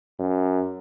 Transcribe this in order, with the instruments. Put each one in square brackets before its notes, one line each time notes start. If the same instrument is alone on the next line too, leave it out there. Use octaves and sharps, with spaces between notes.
[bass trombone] F#2